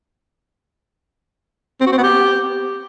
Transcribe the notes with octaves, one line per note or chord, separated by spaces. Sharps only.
C4
F#4
C4
B3
G4